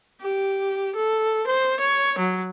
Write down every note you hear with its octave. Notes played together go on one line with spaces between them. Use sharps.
G4
A4
C5
C#5
F#3